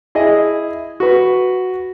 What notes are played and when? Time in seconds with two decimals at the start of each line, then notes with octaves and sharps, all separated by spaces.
0.15 E4 G#4 D#5
1.00 F#4 B4